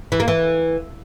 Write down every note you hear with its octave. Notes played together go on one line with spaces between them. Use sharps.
E3
A#3
E3